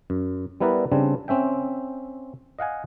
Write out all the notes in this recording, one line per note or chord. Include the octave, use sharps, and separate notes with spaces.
F#2
G3 B3 E4 A#4 B4 D5
C#3 G3 C4 D4
C4 C#4 E5 G5
D#5 F5 F#5 G#5